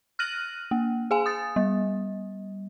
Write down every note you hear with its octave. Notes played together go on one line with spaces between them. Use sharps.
F6 F#6 A#6 D#7 F#7
A#3
G#4 F5 G#5
D#6 A6
G3